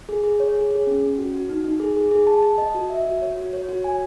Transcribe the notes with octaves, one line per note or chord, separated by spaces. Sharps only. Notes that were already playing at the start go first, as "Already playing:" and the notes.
G#4
G#4
C#5
G#4
G#4
C#4
C#4
F#4
F#4
D#4
D#4
G#4
G#4
G#4
A5
A5
D#5
F#4
E5
F#4
C#5
F#4
C#5
F#4
G#5